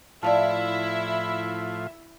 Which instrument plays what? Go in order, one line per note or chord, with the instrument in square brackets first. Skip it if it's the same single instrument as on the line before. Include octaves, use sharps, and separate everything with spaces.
[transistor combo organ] A2 F3 F4 [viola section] E4 E5 [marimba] D5 F5 A5